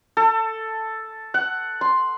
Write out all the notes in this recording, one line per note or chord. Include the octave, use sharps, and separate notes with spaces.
A4
F#5
C6